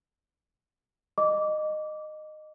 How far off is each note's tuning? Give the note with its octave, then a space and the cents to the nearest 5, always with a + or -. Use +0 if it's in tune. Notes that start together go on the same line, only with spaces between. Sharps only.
D#5 -20 D6 -15